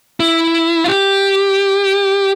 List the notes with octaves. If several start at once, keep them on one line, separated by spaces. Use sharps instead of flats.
E4
F4
G4